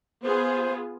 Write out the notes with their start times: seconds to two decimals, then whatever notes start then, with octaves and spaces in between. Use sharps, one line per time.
0.23 B3 F4 G#4 C5